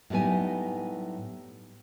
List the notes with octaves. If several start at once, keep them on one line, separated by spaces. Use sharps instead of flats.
A2 F#3 G3 B3 D#4 G#5